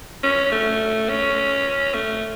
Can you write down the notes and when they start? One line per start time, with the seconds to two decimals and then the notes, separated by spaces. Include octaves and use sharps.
0.23 C#4
0.52 A3
1.09 C#4
1.95 A3